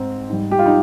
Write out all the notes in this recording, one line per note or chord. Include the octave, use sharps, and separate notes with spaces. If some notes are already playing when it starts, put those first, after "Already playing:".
Already playing: G#2 C4
G#2 G3
G4
F4
D#4